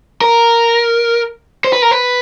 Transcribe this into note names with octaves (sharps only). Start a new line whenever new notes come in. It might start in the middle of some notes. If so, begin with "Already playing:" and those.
A#4
C5
B4
A#4
B4